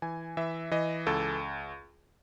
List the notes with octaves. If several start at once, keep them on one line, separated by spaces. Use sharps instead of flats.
E3 G#5
E3 E5
E3 D#5
C#2 A4